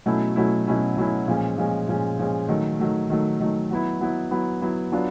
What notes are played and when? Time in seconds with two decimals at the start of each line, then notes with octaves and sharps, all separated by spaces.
0.06 B2 F#3 A3 C#4 E4
0.36 B2 F#3 A3 C#4 E4
0.67 B2 F#3 A3 C#4 E4
0.97 B2 F#3 A3 C#4 E4
1.28 A#2 F3 G#3 C#4
1.57 A#2 F3 G#3 C#4
1.88 A#2 F3 G#3 C#4
2.19 A#2 F3 G#3 C#4
2.49 D#3 F#3 A3
2.80 D#3 F#3 A3
3.10 D#3 F#3 A3
3.40 D#3 F#3 A3
3.71 F#3 B3 E4
4.01 F#3 B3 E4
4.31 F#3 B3 E4
4.61 F#3 B3 E4
4.92 F#3 B3 D4 F4